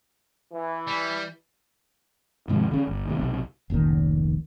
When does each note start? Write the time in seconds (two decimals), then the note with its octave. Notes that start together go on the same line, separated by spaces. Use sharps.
0.52 E3
0.88 G3
2.48 D#2 G#2 C3 F3
2.71 D3 C#4
2.87 G1
3.06 D#2 A2 C3
3.19 B1 C3
3.70 F1 C#2 A#2 D#3